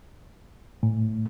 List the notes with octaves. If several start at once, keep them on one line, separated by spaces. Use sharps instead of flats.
A2